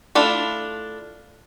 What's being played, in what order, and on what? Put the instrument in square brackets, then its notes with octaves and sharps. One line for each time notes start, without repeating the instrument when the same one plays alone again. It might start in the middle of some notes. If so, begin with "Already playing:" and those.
[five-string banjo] A3 D4 E4 F4